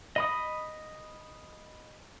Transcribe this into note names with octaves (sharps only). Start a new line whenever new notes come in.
D#5 B5 D#6